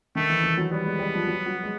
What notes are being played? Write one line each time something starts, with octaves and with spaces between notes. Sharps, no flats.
D#3 A3
E3
E3
F#3
G3 B3
G#3
G3
F3
F#3
F#3
G#3